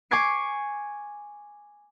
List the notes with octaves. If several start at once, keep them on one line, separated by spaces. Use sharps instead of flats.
G#5 C#6 D6 G#6 C7 D7